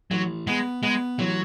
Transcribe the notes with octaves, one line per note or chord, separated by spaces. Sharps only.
A1 F#3
G#3 B3
G#3 B3
A1 F#3